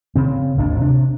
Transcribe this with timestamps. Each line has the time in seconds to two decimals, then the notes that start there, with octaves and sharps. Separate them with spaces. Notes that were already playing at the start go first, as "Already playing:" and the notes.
0.16 C#3 C4
0.57 G#1 D#2 D4
0.80 C3 D4